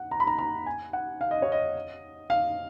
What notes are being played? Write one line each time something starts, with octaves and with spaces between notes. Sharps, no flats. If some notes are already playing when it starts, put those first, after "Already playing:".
Already playing: F#5
A#5
B5
A#5
A#5
G#5
F#5
F5
D#5
C#5
D#5
F5